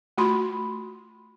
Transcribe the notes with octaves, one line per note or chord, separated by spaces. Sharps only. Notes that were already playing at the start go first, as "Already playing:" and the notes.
A3 F4 F#4 B5 C6